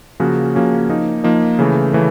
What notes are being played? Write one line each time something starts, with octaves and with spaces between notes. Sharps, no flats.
C#3 F3 A#3 C#4 F#4
C#3 F3 A#3 C#4 F#4
F3 A#3 D#4
F3 A#3 D#4
C#3 E3 A3
C#3 E3 A3